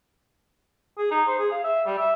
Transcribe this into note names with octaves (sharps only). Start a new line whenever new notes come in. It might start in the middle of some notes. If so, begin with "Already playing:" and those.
G#4
D#4
C5
G#4
F5
E5
G3
E5